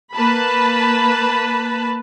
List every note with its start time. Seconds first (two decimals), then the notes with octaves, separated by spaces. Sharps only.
0.13 A#3 B4 A5 B5